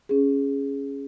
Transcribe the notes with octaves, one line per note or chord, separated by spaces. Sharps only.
C#4 G#4